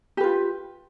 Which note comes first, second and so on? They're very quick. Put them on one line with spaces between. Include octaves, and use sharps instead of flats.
G4 B4 F4